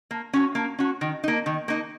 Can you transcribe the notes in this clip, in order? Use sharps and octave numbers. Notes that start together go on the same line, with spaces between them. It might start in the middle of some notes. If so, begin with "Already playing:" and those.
A#3
C#4 F#4
A#3
C#4 F#4
D#3
A#3 D#4
D#3
A#3 D#4